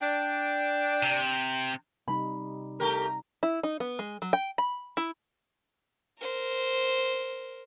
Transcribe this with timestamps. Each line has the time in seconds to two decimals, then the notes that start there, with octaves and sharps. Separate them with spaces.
0.01 D4 G5
1.03 C3
2.08 C3 G3 D#4 B5
2.80 A3 G4 A#4 A#5
3.43 E4
3.63 D#4
3.80 B3
3.99 G#3
4.22 F#3
4.33 G5
4.58 B5
4.97 E4
6.19 A#4 C5